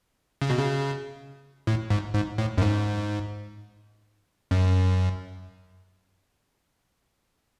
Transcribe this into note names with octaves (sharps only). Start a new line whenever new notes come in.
C#3
B2
C#3
A2
G#2
G#2
A2
F#2
G#2
F#2